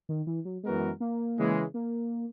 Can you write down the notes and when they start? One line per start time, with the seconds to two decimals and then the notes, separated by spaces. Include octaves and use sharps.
0.09 D#3
0.27 E3
0.45 F#3
0.63 F#2 E3 G#3 B3 F#4 A#4
1.00 A#3
1.38 C#3 E3 G#3
1.74 A#3